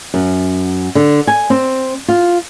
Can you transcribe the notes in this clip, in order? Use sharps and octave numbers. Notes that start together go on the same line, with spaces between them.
F#2
D3
G#5
C4
F4